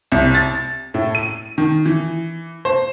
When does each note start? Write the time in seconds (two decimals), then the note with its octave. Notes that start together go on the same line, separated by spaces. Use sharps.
0.12 C2
0.35 A6
0.94 A2
1.15 D#7
1.58 D#3
1.86 E3
2.65 C5